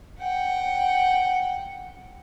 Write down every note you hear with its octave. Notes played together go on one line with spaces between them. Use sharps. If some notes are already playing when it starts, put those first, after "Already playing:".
F#5 G5